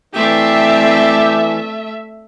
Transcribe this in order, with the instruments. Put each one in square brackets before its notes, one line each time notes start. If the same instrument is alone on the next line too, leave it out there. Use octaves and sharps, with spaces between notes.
[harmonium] E3 [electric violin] A3 E5 [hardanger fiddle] C4 D5 [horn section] G4